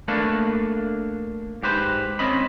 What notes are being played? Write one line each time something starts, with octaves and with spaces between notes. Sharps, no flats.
A3 A#3 D4 A4 B4
G#2 G4 B4 C5
C4 C#4 D#5 B5